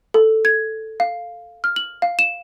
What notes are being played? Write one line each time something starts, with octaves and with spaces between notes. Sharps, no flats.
A4
G#6
F5
F6
F#7
F5
E7